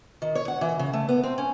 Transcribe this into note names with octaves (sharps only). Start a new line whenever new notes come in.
D#3
C#5
F#5
E3
C#3
A3
B3
C4
C#4